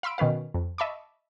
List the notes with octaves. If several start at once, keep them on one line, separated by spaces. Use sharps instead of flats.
F5 B5 C6 E6 D7
B2 D#3 C#4 B4 F5
F2
D#5 E5 A5 B5 C#6 D6